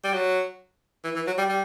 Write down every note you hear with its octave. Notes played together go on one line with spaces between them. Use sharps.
G3
F#3
E3
E3
F#3
G3
G3